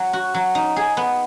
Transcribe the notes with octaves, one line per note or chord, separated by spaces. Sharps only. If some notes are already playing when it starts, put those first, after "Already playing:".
Already playing: F#3
F#4
F#3
D#4
G#4
B3